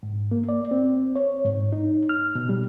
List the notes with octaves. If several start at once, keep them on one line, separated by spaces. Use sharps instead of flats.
G#2
A#3
D5
C4
C#5
G#2
D#4
F6
B2
G3